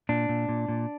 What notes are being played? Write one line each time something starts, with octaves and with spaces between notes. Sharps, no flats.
A#2 D4
A#2
A#2
A#2